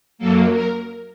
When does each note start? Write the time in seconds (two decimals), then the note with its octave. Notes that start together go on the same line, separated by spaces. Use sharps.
0.18 F#2 F#3 A#3 A4
0.52 A#4